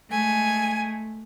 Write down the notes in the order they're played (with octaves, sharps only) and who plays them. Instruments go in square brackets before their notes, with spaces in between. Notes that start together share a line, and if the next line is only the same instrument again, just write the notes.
[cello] G#3 A3 [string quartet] G#5